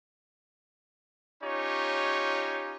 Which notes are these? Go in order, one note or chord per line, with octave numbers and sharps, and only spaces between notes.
C#4 D#4 F4 G4 C#5